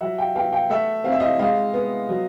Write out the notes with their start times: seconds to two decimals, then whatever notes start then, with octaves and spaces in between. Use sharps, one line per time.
0.01 F#3 E5 F#5
0.18 F5 G5
0.35 B3 F5 G5
0.52 F5 G5
0.70 A3 E5 F#5
1.04 C4 F5
1.12 E5
1.20 D#5 F5
1.39 G#3 D#5 F5
1.74 B3
2.09 F#3